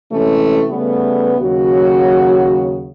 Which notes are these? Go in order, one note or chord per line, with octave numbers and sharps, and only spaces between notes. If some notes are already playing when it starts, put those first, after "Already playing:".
C3 E3 G#3 A3 C#4
C#3 G3 A3 B3
D#2 C#3 F#3 F#4